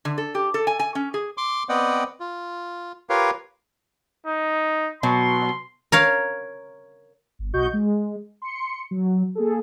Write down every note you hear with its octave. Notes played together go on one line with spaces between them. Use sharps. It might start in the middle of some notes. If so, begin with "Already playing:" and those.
D3
A4
G4
A4
G#5
G#5
C#4
G#4
C6 D6
B3 C4 D5 D#5 F#5 G5
F4
F4 G4 A#4 B4 C#5 F5
D#4
B2 F#3 C6
A#4 C#5 F5
G1
B1 F#4 D#5 C#6 G6
G#3
C6 C#7
F#3
A#3 G#4 A4